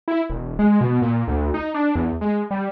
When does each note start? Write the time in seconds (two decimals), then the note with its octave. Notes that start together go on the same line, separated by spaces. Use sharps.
0.08 E4
0.30 E1
0.59 G#3
0.81 B2
1.02 A#2
1.28 D2
1.54 D#4
1.74 D4
1.95 E2
2.21 G#3
2.51 G3